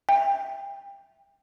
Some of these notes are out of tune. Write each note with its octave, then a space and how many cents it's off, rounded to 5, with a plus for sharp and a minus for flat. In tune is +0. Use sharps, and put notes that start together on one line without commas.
E5 +0 G5 +25